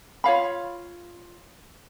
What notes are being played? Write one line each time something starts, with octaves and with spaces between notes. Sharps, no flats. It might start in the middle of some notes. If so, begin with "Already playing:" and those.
F4 C#5 F5 B5